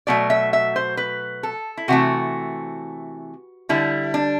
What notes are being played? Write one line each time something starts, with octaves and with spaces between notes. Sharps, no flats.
B2 F#3 A3 D5
E5
E5
C5
B4
A4
E4
C3 E3 A3 F#4
D3 G3 E4
D4